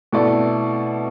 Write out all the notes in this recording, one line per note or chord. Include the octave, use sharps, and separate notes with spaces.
B2 A3 E4 A4 D5